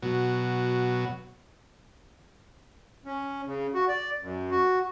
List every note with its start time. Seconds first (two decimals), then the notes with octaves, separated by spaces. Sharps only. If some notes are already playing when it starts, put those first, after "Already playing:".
0.02 B2 F#3
3.05 C#4
3.46 C#3
3.74 F#4
3.88 D5
4.22 F#2
4.51 F#4